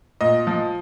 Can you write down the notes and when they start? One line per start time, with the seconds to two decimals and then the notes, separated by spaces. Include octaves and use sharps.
0.21 A#2 D#5
0.47 F3